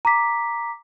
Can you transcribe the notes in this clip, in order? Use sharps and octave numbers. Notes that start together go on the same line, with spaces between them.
A#5 D6 B6